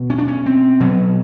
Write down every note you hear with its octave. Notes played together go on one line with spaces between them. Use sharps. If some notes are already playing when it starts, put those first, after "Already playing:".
Already playing: B2
C#4
D4
C#4
C4
B2 F#3